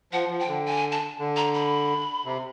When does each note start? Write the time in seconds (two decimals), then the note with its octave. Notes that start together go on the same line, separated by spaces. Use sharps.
0.13 F3 F#5
0.30 F3
0.40 G5
0.48 D3
0.66 G#5
0.92 A5
1.19 D3
1.36 A#5
1.54 B5
2.25 C3